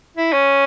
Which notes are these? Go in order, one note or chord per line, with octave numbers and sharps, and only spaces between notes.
E4
C#4